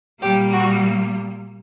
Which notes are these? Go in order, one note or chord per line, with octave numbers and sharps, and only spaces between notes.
A#2 G3 A#3 G4
F#4